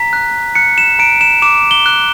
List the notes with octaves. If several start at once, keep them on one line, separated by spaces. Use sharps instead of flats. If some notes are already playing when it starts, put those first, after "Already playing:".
Already playing: A#5 B6
F#6
F#6 C#7
E7
A#5 D7
E7
D6 E7
G7
F#6